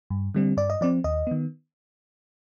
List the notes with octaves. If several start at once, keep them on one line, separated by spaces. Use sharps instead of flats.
G2
D3 G3 C4
G2 D5
D#5
F3 C4 D5
D#2 D#5
D#3 B3